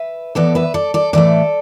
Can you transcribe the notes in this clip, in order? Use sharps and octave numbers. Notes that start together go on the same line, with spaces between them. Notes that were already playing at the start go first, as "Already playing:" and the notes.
Already playing: B4 E5
A2 E3 B3 A4 D5
B4 E5
A4 D5
A4 D5
A2 E3 A3 A4 D5